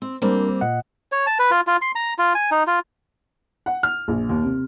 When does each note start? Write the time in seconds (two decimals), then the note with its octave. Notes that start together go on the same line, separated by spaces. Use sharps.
0.02 C4
0.22 G3 A#3 C4 D4 A#4 C5
0.61 A#2 D#5 F#5
1.12 C#5
1.26 A5
1.39 B4
1.51 F4
1.67 F4
1.81 C6
1.95 A#5
2.18 F4
2.35 G#5
2.51 D#4
2.67 F4
3.66 F#5
3.83 F6
4.08 A#1
4.29 D#2
4.44 C3